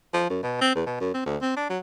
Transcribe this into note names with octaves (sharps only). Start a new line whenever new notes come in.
F3
F#2
B2
C4
E2
B2
F#2
C4
D2
C4
D4
F#3